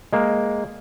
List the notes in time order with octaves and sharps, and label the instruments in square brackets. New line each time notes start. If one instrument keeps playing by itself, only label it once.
[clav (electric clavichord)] G#3 A#3